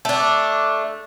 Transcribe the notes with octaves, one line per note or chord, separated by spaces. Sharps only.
A3 D4